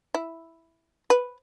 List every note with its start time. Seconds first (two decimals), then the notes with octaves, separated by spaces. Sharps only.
0.14 E4
1.10 B4